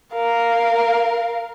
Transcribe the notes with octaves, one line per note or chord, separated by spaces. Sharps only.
A#4 F5